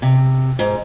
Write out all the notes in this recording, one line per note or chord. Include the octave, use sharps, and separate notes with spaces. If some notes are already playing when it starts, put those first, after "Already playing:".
C3
G#2